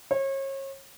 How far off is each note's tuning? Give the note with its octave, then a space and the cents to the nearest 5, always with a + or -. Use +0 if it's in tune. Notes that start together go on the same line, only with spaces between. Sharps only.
C#5 -35